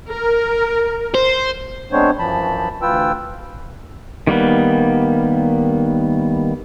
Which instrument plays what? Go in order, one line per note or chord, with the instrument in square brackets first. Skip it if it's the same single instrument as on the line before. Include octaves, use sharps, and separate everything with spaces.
[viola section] A#4
[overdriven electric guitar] C5
[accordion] G#3 B3 C4 D4 C5 C#5
F#2 E3 F3 A5 B5
D2 E3 F4 B4 G5 E6
[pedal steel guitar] D#3 G3 A#3 B3